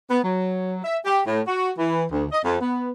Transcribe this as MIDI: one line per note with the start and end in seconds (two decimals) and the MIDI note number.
0.10 0.19 59
0.24 0.80 54
0.84 0.98 76
1.05 1.21 67
1.26 1.41 45
1.47 1.71 66
1.78 2.04 52
2.11 2.25 38
2.32 2.39 75
2.43 2.57 41
2.61 2.91 59